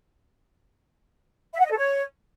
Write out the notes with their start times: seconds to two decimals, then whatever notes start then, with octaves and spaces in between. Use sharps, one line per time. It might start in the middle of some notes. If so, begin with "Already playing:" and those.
1.53 E5
1.59 F#5
1.65 D#5
1.71 A4
1.77 C#5